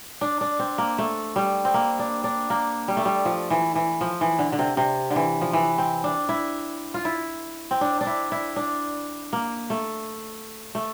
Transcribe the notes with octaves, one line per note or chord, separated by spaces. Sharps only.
D4
D4
C4
A#3
A3
G3
C4
A#3
D4
D4
A#3
G3
A3
G3
F3
E3
E3
F3
E3
D3
D3
C3
C3
D3
E3
F3
E3
C4
D4
E4
F4
E4
C4
D4
D4
E4
E4
D4
A#3
A3
A3